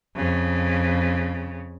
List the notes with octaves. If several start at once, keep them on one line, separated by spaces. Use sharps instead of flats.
F2 C#3